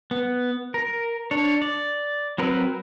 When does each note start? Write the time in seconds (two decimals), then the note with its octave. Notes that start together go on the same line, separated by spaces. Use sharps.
0.11 B3
0.74 A#4
1.31 D4 C#5
1.62 D5
2.38 F#3 C4 A#4 B4